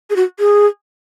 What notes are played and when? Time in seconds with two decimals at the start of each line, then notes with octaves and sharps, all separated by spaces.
0.10 G#4
0.16 F#4
0.39 G#4